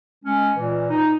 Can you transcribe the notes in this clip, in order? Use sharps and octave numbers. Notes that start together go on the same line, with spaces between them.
G#3 C#4
A#2 E3
D#4